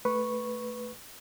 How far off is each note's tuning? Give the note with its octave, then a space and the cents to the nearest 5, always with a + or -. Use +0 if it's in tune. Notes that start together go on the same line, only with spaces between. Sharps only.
A3 +0 B4 +0 C#6 -5